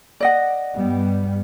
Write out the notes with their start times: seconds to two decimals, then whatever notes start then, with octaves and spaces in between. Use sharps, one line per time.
0.20 D5 D#5 F#5
0.75 G2 G3 B3